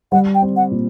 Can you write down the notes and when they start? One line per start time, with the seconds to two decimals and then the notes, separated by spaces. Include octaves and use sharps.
0.12 G3 F#5
0.35 G5
0.42 C4
0.56 F#5
0.71 A#2